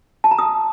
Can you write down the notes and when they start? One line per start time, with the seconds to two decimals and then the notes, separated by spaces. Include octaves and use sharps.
0.24 A5
0.31 A#5
0.39 D#6